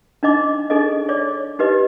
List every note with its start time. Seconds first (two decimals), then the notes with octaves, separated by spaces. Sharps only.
0.23 D4 D#4 D#5 D6
0.70 D4 D#4 G#4 A4 D#5
1.09 C#5 D5 D6
1.59 D#4 G4 B4 D#5